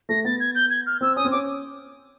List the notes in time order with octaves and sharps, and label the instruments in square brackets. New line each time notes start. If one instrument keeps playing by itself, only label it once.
[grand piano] A3 [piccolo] A#6
[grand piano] B3 [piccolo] A6
[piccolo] G#6
G6
G#6
F6
[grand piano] C4 [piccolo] E6
[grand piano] C#4 [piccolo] D#6
[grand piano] C4
[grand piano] C#4 [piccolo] D6